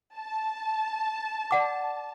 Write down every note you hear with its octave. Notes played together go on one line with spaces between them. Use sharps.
A5
D5 F#5 D6